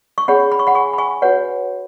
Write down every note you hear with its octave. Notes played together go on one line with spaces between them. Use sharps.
C#6
C#4 G#4 C#5 F#5 B5
B5
C#6
F#5 B5
G#5 C#6
B5
G#5 C#6
F#4 B4 C#5 F#5